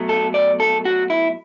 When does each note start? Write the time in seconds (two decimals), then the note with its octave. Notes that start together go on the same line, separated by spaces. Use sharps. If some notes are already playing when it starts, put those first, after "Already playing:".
Already playing: B2 F#3 A3
0.09 A4
0.34 D5
0.60 A4
0.85 F#4
1.10 E4